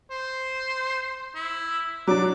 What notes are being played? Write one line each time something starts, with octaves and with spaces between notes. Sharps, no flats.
C5
E4
F#3 D4 D6